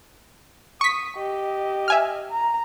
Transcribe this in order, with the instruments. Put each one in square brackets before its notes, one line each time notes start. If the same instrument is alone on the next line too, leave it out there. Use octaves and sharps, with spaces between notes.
[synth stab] C#6 B6 [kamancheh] D#6
[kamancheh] G4 D#5
[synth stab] E5 G#5 F6
[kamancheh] A#5